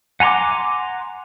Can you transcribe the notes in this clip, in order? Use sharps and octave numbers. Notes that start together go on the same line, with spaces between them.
F#5 G#5 A#5 C6 D6